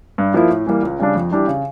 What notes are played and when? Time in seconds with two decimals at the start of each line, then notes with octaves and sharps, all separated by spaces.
0.18 G2
0.34 F3 A#3 E4
0.50 A2
0.67 E3 G3 A#3
0.83 C#2
1.00 C#3 G3 D4
1.16 F2
1.31 E3 G3 D4 G4
1.47 C#3